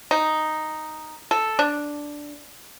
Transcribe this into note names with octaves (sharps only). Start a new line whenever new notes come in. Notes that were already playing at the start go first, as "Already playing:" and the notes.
D#4
A4
D4